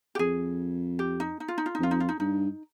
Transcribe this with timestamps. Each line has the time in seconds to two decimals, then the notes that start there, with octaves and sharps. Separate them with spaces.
0.15 G4
0.19 F2 G#4
0.99 G4
1.20 D#4
1.40 D#4
1.48 F4
1.58 D#4
1.66 F4
1.75 D#4
1.80 F2 F4
1.91 D#4
2.00 F4
2.09 D#4
2.20 G2 D#4